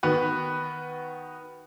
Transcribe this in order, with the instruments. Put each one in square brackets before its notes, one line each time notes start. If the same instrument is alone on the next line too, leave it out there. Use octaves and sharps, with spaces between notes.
[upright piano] D#3 B3 F#4 B4